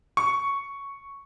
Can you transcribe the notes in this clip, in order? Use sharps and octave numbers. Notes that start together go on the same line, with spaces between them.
C#6